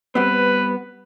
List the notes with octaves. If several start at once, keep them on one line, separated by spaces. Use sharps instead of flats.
G3 B3 C4 B4